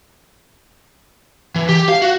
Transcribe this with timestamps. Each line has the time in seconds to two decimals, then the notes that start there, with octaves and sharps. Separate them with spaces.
1.56 E3
1.69 G4
1.89 F5
2.02 F#4